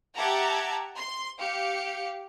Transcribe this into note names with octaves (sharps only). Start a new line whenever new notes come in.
G4 E5 F#5 A5 A#5 G#6
C6
G4 F5 C#7